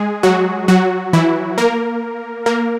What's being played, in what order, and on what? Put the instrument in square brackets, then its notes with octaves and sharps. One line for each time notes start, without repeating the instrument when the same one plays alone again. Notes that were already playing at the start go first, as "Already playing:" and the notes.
Already playing: [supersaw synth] G#3 G#4
F#3 F#4
F#3 F#4
E3 E4
A#3 A#4
A#3 A#4